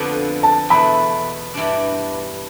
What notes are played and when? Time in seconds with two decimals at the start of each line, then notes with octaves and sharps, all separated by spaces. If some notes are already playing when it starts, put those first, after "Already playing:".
Already playing: F2 D3 F3 B3
0.43 A5
0.69 E2 B2 A3 E4 B5
1.54 G2 E3 G3 D4